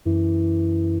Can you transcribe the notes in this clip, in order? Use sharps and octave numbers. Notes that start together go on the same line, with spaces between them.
F#2 E3